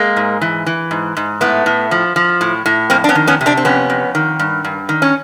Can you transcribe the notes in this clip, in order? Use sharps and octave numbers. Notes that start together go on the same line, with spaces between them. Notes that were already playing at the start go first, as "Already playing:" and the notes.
Already playing: G#3 A#3
G#2
E3
E3
G#2
G#2
A2 A3 B3
A2
F3
F3
A2
A2
F2 A#3 C4
D4
B3 C#4
D#3
B3 C#4
C3
C4 D4
C4
F2 B3 C#4
F2
D#3
G2
G2
D#3
C#4